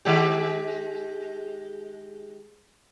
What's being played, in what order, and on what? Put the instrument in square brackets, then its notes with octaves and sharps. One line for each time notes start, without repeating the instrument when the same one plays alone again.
[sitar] D#3 G#3 G4